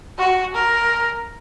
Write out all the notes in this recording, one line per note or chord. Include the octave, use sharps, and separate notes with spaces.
F#4
A#4